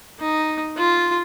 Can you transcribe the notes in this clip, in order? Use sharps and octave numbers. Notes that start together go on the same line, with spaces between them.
D#4
F4